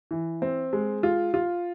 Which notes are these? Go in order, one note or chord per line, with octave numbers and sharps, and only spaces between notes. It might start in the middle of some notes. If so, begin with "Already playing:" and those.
E3
C4
G#3
F4
F4